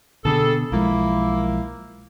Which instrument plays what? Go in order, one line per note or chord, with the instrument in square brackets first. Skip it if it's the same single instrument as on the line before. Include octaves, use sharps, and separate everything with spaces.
[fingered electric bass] B2 D3 B3 [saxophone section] G3 G#4 A4
[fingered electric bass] B1 F3 G#3 [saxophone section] A#3 E4